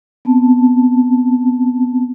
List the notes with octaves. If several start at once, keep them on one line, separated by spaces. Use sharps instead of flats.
B3 C4 A5